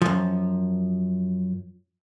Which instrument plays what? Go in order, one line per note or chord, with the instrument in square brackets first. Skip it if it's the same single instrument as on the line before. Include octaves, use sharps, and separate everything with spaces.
[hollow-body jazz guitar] F#2 F3